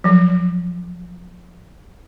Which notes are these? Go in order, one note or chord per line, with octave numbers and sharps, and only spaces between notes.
F3 F#3